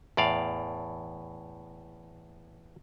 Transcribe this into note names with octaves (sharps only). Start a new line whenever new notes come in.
E2 A2 D5 F5